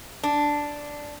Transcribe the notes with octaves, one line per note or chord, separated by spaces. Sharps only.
D4